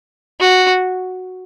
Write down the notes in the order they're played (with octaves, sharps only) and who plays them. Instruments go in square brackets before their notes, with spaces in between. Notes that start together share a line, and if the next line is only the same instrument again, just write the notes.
[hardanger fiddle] F#4